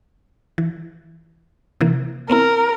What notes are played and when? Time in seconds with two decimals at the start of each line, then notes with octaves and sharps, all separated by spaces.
0.58 E3
1.81 C3 E3 A#3
2.30 B3 C4 E4 A#4